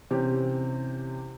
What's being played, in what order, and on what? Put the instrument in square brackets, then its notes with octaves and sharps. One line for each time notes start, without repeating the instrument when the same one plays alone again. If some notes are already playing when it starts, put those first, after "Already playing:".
[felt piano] C3 E3 C#4 G4